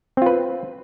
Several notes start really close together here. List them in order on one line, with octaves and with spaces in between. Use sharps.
C4 F4 B4